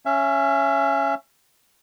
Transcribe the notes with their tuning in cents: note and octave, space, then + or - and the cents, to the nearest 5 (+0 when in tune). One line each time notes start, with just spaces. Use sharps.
C#4 +0 E5 +30